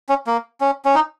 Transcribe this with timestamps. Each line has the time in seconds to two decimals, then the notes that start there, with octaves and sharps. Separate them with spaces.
0.09 C#4
0.27 A#3
0.61 C#4
0.85 C#4
0.95 D#4